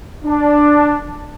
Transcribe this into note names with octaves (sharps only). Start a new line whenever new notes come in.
D4